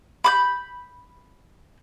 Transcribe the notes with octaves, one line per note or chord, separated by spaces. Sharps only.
B5 D6 G6